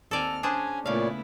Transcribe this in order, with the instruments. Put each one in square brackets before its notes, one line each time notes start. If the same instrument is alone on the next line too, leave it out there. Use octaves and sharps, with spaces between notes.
[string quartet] D#2 C4 F6 [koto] A4 D5 G#5
[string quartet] C#4 [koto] D4 G#4 C5 [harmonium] G#5
[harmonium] A#2 C#5 D5 [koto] C#3 F5 [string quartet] A3 B3 E4